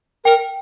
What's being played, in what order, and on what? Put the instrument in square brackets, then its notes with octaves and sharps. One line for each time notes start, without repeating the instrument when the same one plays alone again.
[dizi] A#4 [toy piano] G5